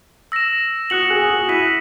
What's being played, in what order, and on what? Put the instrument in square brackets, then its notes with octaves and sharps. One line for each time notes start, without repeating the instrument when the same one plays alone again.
[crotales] E6 A#6 E7
[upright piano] F#4 [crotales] D#6 F#6 C#7 F#7
[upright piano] G#4
F#4
[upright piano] E4 [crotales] F#6 B6 D#7 F#7